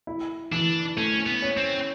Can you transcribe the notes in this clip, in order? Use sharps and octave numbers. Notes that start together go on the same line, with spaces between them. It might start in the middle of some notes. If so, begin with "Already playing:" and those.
E4
E3 D4
A3 C#4
B3
C#4
C4